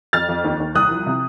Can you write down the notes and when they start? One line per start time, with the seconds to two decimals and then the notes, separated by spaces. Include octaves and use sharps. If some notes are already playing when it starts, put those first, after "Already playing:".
0.13 F2 F6 A6
0.29 F2
0.44 D#2
0.60 D#2
0.75 C2 D#6 F#6
0.91 F3
1.06 C3